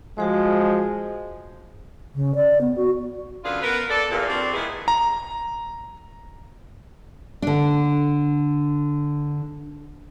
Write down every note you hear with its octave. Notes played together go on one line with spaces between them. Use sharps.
F3 G#3 F#4 G#4 C5
C#3
D5
B3
F#4
F#2 D3 D4 F4 G#4 B4
B3 A#4 B4
A4 D5
E2 A#2
F3 C4 D4 G4 C#5 D5
A#2 D#3 G#3 B3 E4 G#4
A#5
D3 D4